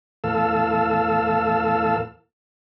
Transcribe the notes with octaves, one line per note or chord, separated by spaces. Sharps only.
E2 A2 A4 F5 E6